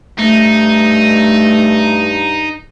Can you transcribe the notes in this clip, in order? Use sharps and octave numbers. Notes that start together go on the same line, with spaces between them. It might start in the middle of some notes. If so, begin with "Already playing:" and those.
G2 A3 D#4